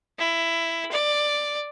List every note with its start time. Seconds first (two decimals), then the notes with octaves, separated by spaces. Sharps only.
0.19 E4
0.91 D5